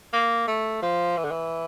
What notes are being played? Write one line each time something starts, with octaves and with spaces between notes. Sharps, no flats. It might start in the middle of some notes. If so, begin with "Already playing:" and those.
A#3
A3
F3
E3
D3
E3